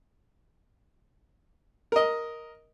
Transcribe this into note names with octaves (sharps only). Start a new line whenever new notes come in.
A#4 D#5